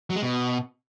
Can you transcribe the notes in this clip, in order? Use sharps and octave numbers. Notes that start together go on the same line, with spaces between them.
F#3
G#3
B2